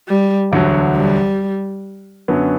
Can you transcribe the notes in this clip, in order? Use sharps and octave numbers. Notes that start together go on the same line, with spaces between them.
G3
E1 D2 D3 F#3
G3
F#2 D3 F#3 B3